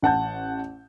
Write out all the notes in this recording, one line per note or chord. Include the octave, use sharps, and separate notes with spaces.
A1 F#5 A5 G6